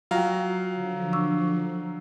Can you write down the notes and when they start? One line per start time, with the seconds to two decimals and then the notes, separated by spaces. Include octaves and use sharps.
0.11 F#3 F4 F5 G5 A#5
0.74 D3 F3
1.13 D4 C#6 E6